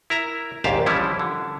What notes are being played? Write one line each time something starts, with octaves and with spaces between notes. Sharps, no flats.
E4 A#4 E5 A#5
A#1 D#2 G#2 G4 F5 A5
E3 F3 G3 C#4 E4
D3